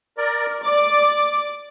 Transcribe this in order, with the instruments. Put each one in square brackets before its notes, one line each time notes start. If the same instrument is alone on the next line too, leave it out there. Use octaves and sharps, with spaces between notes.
[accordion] A#4 D5
[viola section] D5 [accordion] D6